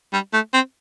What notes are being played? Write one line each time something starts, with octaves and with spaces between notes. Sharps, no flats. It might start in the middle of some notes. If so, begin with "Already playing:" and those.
G3
A3
C4